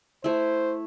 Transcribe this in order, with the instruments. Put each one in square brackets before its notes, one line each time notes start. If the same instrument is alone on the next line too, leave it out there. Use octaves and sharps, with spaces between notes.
[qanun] A3 E4 [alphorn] C5